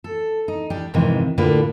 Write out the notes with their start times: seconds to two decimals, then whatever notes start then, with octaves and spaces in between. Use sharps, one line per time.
0.04 A4
0.48 D#4
0.70 G3 D4 G4
0.94 F2 G#2 C3 D#3 E3
1.38 A2 D3 A#3 F4 B4